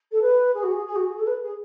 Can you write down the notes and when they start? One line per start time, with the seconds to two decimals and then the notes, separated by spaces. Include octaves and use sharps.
0.12 A4
0.22 B4
0.54 G#4
0.63 F#4
0.71 G#4
0.86 G#4
0.96 F#4
1.05 G#4
1.19 A4
1.27 B4
1.43 G#4